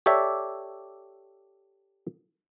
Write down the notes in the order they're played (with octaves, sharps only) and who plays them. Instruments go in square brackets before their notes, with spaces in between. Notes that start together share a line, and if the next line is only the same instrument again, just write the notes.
[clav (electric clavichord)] G4 A4 C#5 D5 E5